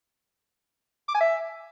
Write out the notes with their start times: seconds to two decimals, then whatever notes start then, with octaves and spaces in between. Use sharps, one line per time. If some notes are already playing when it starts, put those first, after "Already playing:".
1.08 D6
1.15 G#5
1.21 E5